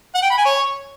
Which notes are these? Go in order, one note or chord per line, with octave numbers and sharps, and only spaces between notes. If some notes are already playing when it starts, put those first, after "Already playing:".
F#5
G5
B5
G#5
C#5